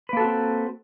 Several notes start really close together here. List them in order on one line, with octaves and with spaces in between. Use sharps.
B4 A#3 A4 F#4 C4